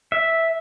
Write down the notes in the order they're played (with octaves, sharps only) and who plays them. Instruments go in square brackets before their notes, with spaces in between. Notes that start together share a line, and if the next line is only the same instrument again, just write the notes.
[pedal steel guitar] E5